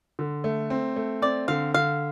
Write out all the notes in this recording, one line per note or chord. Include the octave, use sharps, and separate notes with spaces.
D3
A3
C4
A3
C4 D5
D3 F5
D3 F5